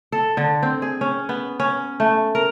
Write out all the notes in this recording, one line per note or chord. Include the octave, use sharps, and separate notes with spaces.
A4
D3
C4
G#4
C#4
B3
C#4
A3
A#4